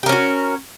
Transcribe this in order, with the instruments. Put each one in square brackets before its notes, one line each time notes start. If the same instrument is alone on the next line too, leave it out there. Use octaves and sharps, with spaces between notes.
[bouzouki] G4
A#4
C#4
F#4